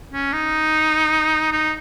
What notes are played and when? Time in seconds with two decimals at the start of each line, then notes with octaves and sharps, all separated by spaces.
0.13 C#4
0.33 D#4
1.52 D#4